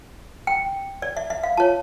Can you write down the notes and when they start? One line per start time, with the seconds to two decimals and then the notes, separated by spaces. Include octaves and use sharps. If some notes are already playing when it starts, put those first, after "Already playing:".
0.47 G5
1.02 D5
1.17 E5
1.30 E5
1.43 F5
1.57 F4 C#5 A5